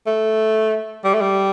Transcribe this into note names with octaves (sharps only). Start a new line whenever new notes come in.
A3
G3
A3
G3